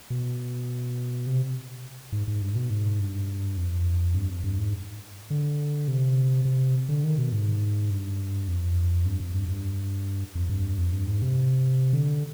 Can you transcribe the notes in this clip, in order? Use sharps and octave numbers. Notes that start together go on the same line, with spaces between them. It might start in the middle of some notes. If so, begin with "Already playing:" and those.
B2
C3
G#2
G#2
G2
G#2
B2
G#2
G2
F2
G2
F2
G2
G#2
D3
C3
C3
D3
D#3
B2
G#2
G2
F2
G2
F2
G2
G2
F2
G2
F2
G2
G#2
C3
D3